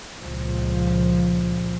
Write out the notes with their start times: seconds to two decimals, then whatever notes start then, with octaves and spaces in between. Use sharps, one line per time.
0.22 C#2 A#2 F3